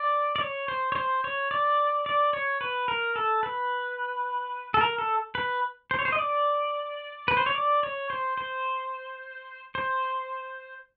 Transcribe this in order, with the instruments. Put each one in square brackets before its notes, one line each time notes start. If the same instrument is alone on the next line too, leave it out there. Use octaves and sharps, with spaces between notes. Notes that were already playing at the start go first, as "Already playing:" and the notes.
Already playing: [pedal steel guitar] D5
D5
C#5
C5
C#5
C5
C#5
D5
D5
C#5
B4
A#4
A4
B4
A4
A#4
A4
B4
C5
C#5
C5
D#5
D5
B4
C5
C#5
D5
C#5
C5
C5
C5